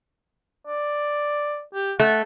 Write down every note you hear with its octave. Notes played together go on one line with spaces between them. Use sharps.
D5
G4
A3 F#5